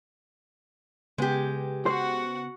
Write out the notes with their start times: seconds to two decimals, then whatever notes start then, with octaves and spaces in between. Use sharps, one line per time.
1.18 C#3 G#3 B3 G4
1.86 F#4 C5 F#5